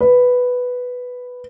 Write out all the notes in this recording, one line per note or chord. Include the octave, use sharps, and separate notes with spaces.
B4